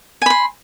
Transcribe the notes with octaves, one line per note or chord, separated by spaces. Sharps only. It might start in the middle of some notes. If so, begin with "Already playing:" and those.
G#5 B5 C6